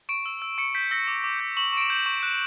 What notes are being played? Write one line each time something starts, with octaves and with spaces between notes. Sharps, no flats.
C#6 D7
E6
E6
C#6 C#7
G6 B6
E6 A#6
D6
D6
G6
C#6 F#7
C#6 D7
E7
G6
C#6
F#6